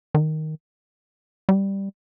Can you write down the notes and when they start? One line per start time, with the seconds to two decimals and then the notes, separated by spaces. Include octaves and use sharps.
0.15 D#3
1.49 G3